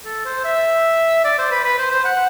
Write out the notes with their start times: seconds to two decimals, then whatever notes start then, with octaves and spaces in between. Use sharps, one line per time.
0.05 A4
0.25 C5
0.45 E5
1.24 D5
1.38 C5
1.51 B4
1.64 B4
1.78 C5
1.91 C5
2.05 F#5